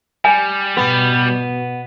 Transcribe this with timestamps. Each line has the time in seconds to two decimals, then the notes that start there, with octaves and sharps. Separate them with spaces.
0.25 G3 G#5
0.77 B2 B3